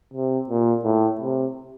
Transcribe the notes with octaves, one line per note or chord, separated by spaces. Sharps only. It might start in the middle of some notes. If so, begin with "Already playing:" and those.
C3
A#2
A2
C3